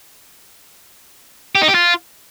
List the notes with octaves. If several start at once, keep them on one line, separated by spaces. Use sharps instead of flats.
G4
D#4
G4
F4